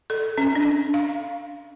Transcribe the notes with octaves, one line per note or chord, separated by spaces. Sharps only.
A4
C#4
D4
F5